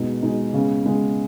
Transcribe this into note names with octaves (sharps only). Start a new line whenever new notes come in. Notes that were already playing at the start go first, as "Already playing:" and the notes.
Already playing: B2 G#3 D#4
B2 G#3 D#4
C#3 G#3 B3
C#3 G#3 B3